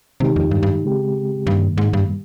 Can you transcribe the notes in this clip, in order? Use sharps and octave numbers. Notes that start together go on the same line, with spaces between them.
C3 D#3 G#3 D#4 G4
F2
G2
G2
C#3 G#3 C4 G4
G2 C3 D#3 A#3
G#2
G2
G3